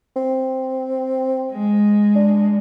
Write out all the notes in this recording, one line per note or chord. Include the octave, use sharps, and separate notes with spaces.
C4
G#3
D4